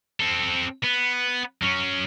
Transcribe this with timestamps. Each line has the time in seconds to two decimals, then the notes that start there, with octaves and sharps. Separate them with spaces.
0.20 C4 A4
0.84 B3
1.62 F#3 C#4